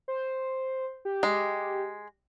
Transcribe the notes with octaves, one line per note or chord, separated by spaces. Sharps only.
C5
G4
G#3